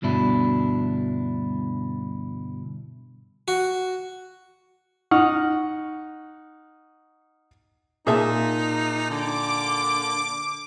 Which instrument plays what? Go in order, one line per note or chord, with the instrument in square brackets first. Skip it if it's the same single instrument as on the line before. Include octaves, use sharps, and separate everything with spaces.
[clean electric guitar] D2 G2 B2 D4 E4
[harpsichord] F#4
[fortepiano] D#4 F#5 C#6 F6
[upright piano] A#2 [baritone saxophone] D#4 [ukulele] G#4 E5 A5
[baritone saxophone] D3 [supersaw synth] D6